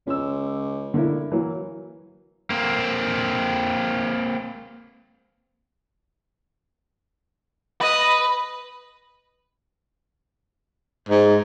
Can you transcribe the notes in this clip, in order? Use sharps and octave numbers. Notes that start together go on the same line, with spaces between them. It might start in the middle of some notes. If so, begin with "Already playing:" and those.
C#2 C#4 E6
D3 A#3 E4
E3 F#3 A#3
A#3 C4
B4 D#5
G#2